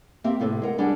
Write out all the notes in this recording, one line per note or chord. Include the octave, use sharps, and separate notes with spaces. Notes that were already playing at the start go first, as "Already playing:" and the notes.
A#3 C4 G4 E5
A2 C3 A4 B4 C5
G#3 A#4 F#5
G3 D4 G4 G#4 F#5